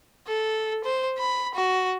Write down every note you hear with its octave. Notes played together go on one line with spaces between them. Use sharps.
A4
C5
B5
F#4